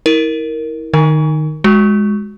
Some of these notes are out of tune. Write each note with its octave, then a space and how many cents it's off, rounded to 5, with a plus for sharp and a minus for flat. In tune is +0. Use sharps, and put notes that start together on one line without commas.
E4 -30 A#4 +0
D#3 -25 D#4 +10 A#4 +0
G#3 +0 F#4 +0